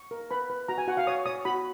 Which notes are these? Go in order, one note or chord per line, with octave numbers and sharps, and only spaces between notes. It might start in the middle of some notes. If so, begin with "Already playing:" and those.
Already playing: C#6
A#4
B4 B5
B4
F#4 A#5
G#5
F#4 F#5
F5
C#5 D#6
C#5 D#6
F#4 B5